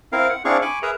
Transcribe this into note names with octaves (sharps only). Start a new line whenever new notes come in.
C4 E4 A#4 F5
F#5
C4 D4 E4 G#4 F5 C#6
G#5 B5 C#6 D6
G#4 A#4 B4 E5 A#5